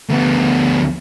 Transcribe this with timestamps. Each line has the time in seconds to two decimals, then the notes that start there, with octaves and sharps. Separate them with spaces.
0.10 D2 B3